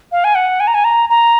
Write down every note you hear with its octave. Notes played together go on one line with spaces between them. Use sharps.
F5
G#5
F#5
G#5
A#5
G#5
A#5
A#5